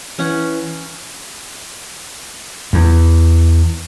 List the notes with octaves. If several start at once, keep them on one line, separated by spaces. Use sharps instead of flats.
E3 C#4 F#5
E2